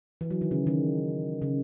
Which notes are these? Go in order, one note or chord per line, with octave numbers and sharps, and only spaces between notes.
E3
F#3
D#3
C#3
D#3
C#3